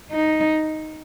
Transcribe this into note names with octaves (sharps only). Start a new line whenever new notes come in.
D#4